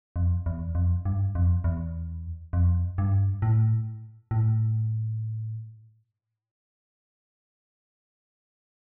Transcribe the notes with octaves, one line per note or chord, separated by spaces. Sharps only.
F2
E2
F2
G2
F2
E2
F2
G2
A2
A2